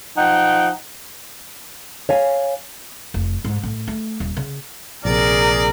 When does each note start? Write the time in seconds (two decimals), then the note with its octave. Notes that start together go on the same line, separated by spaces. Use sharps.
0.16 F3 D#4 F#5 G5
2.09 C#5 F5 G#5
3.14 F1
3.45 G#2
3.63 A2
3.88 A3
4.20 D#1
4.37 C#3
5.05 A#1 C3 G#4 A#4 D5